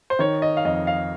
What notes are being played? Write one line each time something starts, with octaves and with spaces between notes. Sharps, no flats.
C5
D#3 C#5
D#5
F5
F2 D#5
F5